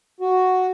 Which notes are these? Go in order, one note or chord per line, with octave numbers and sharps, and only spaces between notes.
F#4